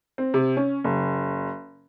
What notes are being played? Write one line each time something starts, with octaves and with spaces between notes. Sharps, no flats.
C4
C3
C#4
F#1